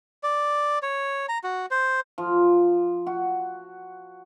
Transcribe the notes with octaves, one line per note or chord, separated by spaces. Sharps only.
D5
C#5
A#5
F#4
C5
F3
F#4